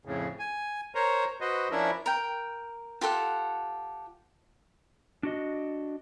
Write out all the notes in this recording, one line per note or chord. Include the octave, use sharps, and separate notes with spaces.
F2 A2 C#3
G#5
A#4 C5 C#5 A#5
F#4 B4 C5 D#5
F3 C#4 D4 E4 A#4 E5
A#4 G5
F4 G4 A4 F#5
D4 F#4 D#5